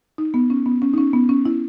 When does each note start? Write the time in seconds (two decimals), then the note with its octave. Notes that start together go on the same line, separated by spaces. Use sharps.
0.18 D#4
0.34 B3
0.50 C#4
0.66 B3
0.82 C#4
0.94 D#4
0.98 C#4
1.13 B3
1.29 C#4
1.45 E4